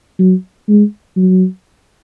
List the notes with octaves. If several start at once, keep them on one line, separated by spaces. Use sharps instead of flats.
F#3
G#3
F#3